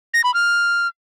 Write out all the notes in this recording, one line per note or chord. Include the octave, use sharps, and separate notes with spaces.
A#6
B5
F6